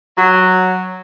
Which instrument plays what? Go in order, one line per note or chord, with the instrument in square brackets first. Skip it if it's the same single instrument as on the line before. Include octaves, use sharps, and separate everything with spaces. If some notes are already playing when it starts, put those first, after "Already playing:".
[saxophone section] F#3